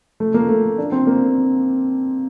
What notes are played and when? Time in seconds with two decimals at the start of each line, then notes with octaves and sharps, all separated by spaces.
0.20 A3
0.34 A#3
0.49 A3
0.78 D4
0.92 C4
1.07 A#3